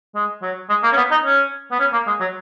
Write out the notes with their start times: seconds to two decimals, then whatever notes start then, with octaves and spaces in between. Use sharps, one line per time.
0.15 G#3
0.42 F#3
0.69 G#3
0.83 A#3
0.92 C#4
0.97 B3
1.11 D#4
1.24 C#4
1.72 B3
1.79 C#4
1.93 A#3
2.07 G#3
2.20 F#3